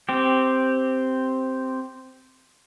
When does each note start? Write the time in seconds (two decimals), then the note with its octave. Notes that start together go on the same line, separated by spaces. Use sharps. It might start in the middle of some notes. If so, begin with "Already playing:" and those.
0.09 C4 G4